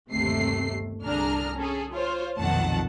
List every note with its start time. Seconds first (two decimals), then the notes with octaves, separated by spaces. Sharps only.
0.12 G1 D#2 C3 A3 C7
1.03 C2 D3 D4 G#4 A#5 F6
1.58 C#4 G#4 A4
1.92 F4 C5 C#5
2.39 B1 F2 A#2 D#3 F#5 A5